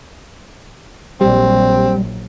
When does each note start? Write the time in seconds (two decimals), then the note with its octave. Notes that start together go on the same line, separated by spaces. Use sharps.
1.21 A#1 F#3 G3 C4